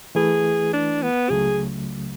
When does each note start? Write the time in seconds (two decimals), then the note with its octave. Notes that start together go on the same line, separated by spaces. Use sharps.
0.15 E3 A3 E4 G#4 B4
0.73 D4
1.03 B3
1.30 C#2 C#3 F#3 A3 G#4